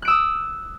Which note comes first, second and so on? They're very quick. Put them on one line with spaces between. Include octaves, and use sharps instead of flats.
F#6 D7 E6 D#6